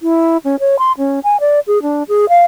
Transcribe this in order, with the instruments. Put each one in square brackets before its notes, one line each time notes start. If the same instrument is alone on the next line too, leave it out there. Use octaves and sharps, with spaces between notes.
[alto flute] E4
C#4
C#5
C6
C#4
G#5
D5
G#4
D4
G#4
F5